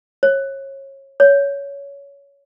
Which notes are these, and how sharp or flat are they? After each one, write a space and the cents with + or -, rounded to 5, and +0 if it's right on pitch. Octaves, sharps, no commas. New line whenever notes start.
C#5 -25
C#5 +20